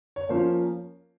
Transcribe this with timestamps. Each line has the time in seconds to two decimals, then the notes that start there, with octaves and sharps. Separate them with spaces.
0.16 C#5
0.29 F3 A#3 C#4 C5